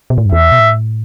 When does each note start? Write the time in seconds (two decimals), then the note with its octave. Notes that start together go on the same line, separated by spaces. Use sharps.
0.10 B2
0.18 A2
0.26 G2
0.32 E2 E5
0.52 B2
0.59 A2